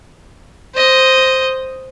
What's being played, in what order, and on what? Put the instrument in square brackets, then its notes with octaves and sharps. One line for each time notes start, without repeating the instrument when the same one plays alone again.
[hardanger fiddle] C5 D#5